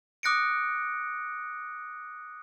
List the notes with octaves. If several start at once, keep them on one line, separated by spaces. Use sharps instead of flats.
D6 D#6 F#6 A#6 C#7 D7